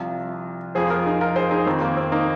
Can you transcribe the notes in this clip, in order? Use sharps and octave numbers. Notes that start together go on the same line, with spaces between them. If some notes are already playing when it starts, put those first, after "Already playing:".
Already playing: C2 C3 F3 F4
F2 F3 G#4 C5
F4 A#4
D#4 G#4
F4 A#4
G#4 C5
D#4 G#4
F2 D#3 C4
A#3
C4
A#3 D#4